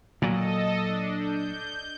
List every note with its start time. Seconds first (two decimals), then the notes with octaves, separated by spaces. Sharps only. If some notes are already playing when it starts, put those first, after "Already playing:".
0.22 A#2 F#3 A4 D#5
0.78 D4
1.18 G6